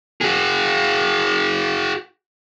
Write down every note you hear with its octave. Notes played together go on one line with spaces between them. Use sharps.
F#4 G#4